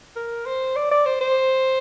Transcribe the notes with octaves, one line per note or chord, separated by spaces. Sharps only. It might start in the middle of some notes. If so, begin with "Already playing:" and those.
A#4
C5
D5
D5
C5
C5